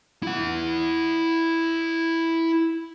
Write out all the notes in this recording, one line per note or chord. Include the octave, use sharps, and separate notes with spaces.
E4 F#5